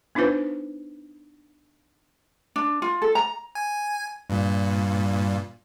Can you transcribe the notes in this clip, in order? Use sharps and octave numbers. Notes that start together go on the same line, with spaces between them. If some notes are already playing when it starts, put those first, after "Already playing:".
B3 D4 D#4 F4 B4 C5
D4
F4
A4
A#5
G#5
G2 A#2